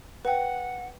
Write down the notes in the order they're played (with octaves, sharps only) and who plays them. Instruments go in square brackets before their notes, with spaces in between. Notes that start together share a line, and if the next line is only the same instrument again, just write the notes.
[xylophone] B4 G5 [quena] F#5